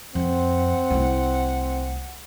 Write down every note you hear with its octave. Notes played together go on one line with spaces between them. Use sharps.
F2 C4 F#5
C2 A3 E4